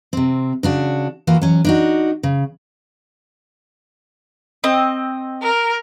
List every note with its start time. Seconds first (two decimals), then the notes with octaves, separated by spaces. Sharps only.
0.13 C3 C4
0.63 C#3 D4 F#4
1.27 E3 A#3 F4 F#4
1.42 F#3 C#4
1.65 D4 D#4 F#4
2.23 C#3
4.64 C4 D#5
5.43 A#4